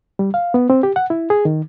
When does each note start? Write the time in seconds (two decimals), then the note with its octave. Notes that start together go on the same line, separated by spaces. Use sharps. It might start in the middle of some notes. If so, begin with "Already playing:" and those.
0.19 G3
0.34 F5
0.54 B3
0.70 C4
0.83 G4
0.96 F#5
1.10 E4
1.30 G#4
1.45 D#3